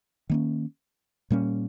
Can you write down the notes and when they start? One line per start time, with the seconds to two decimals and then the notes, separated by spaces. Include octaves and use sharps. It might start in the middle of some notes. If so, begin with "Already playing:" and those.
0.30 D#3 A#3 C#4
1.30 A#2 G3 A#3 C#4